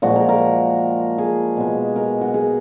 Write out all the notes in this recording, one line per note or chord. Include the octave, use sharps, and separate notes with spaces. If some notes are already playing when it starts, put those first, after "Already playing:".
A#2 F3 G#3 F#4
A#4
A#4
G#4
B2 G#3
A#4
F#4
G#4